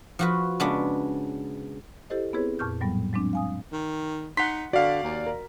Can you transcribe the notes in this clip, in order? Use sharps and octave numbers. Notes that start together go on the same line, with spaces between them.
F3 F#4 B4
C#3 G#3 B3 D4
E4 G4 A4 C5 D#5
B3 C4 E4 G#4 B4 C#5
F2 A#2 C#6 F6 G6
A2 F#3 G3 B3
F#3 G#3 C4 D4
F5 G#5 D#6
D#3
D#4 F#5 C6 B6
D3 F#4 D5 F5
D#2
A#4